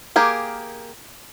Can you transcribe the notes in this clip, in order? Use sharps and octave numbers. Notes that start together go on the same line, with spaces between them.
A#3 G4 G#4 A#4